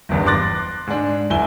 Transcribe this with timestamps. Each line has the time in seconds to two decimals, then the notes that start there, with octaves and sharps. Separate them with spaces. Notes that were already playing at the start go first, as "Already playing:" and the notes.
0.09 F#1 E2 G2
0.26 C6 D6 F#6 A6 A#6
0.87 G#2 D4
1.30 F#1 E4 G#5 E6 G7